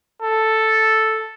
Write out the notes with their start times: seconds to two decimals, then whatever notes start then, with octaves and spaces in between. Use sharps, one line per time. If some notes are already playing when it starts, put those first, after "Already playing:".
0.22 A4